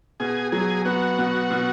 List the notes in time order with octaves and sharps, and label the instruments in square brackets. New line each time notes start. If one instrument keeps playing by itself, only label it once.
[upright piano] B2 [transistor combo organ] G#4
[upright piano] F#3 [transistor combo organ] G#4
[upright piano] B3 [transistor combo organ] F#4
[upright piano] B2
B2